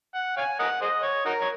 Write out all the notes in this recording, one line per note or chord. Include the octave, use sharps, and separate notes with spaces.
F#5
C#5 F5 G#5
A#4 D#5 F#5
G#4 C5 D#5
C#5
D#4 F#4 A#4
C#5